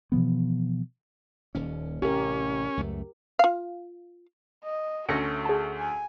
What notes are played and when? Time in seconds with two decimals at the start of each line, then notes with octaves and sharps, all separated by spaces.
0.12 B2 E3 F3 B3
1.55 D#1 D#2 C#4
2.02 A1 C3 C#4 G4 A#4
2.77 C#2 F#2 A3
3.39 F4 F5
4.65 D#5
5.09 D2 A3 C#4 F#4 A#6 C#7
5.45 G#4 A5
5.77 G#5